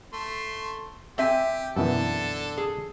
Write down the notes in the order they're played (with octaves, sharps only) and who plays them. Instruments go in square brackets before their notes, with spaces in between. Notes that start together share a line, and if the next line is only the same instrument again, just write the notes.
[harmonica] A3 C6
[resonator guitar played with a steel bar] C4 E5 G#5 [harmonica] G4
[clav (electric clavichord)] F#2 B2 E3 [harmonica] D3 A4
[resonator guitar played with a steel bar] G#4